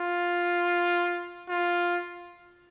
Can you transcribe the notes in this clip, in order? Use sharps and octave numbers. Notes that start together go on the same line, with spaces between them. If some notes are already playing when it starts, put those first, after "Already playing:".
Already playing: F4
F4